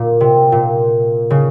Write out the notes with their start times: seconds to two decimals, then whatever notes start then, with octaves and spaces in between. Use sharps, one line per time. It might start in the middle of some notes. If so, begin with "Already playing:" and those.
Already playing: A#2
0.21 C3
0.52 A#2
1.30 C#3